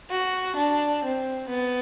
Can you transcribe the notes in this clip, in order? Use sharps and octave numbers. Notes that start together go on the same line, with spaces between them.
F#4
D4
C4
B3